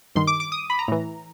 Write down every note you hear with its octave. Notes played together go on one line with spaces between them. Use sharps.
G2 D#3 C6
D6
D6
D#6
B5
A#5
A2 E3